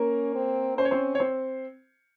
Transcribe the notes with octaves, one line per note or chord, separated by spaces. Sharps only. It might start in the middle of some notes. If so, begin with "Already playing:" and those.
Already playing: A#3 C#4 A#4
C4
C#4 C5
C#5
C4 C5
C#5
C4 C5